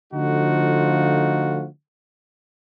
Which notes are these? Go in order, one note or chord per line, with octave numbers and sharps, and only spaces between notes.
D3 F3 A3 D#4 F4 F#4